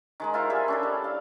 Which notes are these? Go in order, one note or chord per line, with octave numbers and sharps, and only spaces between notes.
D#3 G#3 D#4
E4 F4 A#4 C5
G3 G#4 E5
C#4 D4 A4
G3
F5